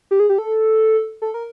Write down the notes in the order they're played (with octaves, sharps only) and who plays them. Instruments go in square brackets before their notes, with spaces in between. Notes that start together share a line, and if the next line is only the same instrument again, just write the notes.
[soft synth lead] G4
G#4
G4
A4
A4
A#4